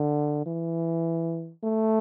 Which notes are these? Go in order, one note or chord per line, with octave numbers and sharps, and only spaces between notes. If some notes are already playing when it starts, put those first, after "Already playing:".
Already playing: D3
E3
A3